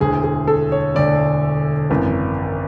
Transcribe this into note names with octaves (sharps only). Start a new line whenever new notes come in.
E1 D2 D3 G#4
G#4
A4
C#5
E1 D2 D3 D5
G#1 F#2 E3